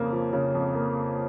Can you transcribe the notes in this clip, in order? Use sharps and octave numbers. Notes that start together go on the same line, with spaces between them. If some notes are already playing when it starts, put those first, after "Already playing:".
Already playing: F2 C#3 F3 A#3
F3
C#3
F2
A#3